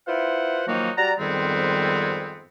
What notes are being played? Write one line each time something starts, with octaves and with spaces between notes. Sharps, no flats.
E4 F4 B4 C5 F#5
D#3 F3 F#3 A#3 D#4 F#4
G3 F#4 D5 A#5
F2 G#2 D#3 G3 B3 C4